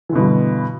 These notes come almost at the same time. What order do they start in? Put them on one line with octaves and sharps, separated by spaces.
E3 D3 B2 G2